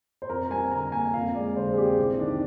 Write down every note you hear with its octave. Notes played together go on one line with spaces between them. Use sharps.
C5
F2 A#4
G3 G#5
D3 A#5
A#3 G#5
F2 F5
G#3 D5
D3 C5
G#4
F2 G4
C2
D#3 D4